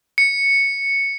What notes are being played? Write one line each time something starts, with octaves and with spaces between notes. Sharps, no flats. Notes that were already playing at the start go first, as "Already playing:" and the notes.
C#7